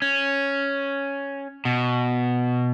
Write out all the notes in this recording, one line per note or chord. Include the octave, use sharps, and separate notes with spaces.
C#4
B2